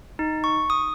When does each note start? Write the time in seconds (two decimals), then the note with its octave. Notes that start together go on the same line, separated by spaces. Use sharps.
0.19 D#4
0.44 C#6
0.70 D#6